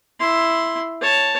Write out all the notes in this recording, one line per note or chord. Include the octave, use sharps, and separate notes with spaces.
E4 C6
C#5 A5